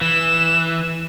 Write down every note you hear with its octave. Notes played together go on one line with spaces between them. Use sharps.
E3 E7